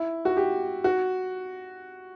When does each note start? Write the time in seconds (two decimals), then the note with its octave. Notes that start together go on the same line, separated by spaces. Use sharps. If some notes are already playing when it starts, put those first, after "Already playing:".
Already playing: E4
0.25 F#4
0.37 G4
0.84 F#4